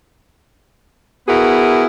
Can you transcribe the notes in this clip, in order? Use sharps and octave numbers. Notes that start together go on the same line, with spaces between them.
B3 E4 F#4 G#4 A#4